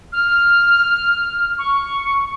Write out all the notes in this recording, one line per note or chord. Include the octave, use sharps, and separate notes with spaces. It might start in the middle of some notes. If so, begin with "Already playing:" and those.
F6
C#6